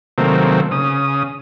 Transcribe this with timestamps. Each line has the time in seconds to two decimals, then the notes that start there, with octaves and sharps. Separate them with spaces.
0.18 C3 D#3 F#3 A3 A#3 C4
0.71 C#3 D#6